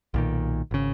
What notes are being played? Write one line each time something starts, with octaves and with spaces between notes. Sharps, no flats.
B1 A#2 D#3
G#1 C#3